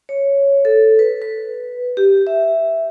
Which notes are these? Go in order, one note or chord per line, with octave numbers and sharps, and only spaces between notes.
C#5
A4
B4
B4
G4
E5